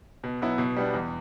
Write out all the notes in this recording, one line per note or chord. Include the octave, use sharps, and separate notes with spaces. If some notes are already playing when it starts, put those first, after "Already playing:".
B2
F#3 B3 E4
B2
G3 B3 D4
E2